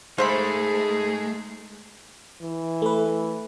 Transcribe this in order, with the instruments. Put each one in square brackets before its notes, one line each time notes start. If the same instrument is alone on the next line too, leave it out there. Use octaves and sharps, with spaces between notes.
[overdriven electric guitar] G#3 D#4 [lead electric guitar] A3 [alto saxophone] G#4 [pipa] C5 E5 B5
[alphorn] E3
[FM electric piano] A3 B4